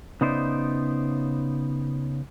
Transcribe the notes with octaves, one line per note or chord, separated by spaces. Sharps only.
C#3 B3 D#4 C5 D5 E5